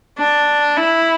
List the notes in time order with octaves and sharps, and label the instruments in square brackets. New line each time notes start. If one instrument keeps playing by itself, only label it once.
[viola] D4
E4